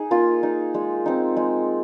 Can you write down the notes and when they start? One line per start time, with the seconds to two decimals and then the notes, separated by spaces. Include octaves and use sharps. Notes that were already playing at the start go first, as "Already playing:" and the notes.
Already playing: D#4 G#4
0.11 A#3 F4
0.43 D#4
0.74 G#3
1.06 C4 D#4
1.37 G#3